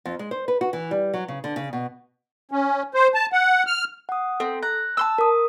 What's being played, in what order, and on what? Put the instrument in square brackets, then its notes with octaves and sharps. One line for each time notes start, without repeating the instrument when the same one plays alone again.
[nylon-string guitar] F2
G#3
C5
B4
F#4
E3
G3
F#3
C#3
D3
C#3
B2
[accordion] C#4
C5
A5
F#5
F6
[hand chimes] F#5 D#6
[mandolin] C4 [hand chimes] A4
[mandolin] A#5 [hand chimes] F#6
[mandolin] A5 C6 E6
[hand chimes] A#4 D#6